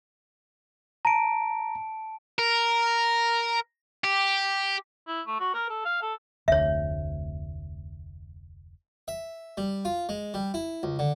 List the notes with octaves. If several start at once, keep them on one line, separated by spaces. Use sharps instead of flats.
A5 A#5 D7
A#4
G4
E4
A3
F#4
A#4
A4
F5
A4
F1 D2 C#5 E5
E5
G3
F4
G#3
G3
E4
C#2
D3